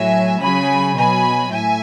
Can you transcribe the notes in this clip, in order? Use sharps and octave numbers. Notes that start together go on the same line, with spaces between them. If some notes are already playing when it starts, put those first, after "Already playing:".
Already playing: A2 F#3 E5 G#5
C#3 F#3 G#5 B5
B2 F#3 G#5 B5
A2 E5 G#5